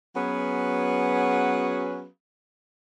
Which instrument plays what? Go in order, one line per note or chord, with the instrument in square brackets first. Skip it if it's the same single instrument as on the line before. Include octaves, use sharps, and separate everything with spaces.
[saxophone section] F#3 B3 C#4 F#4 G#4 B4